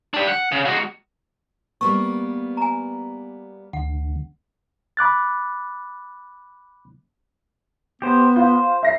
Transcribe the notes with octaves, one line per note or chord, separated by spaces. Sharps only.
D4 G4
F#5
C#3
G#3 F#4
G3 A#3 B3 C#6
G#5 A#5
D2 F#5
B5 D6 F#6 A6
B3 G4 C5
F4 C5
E5 A#6 C7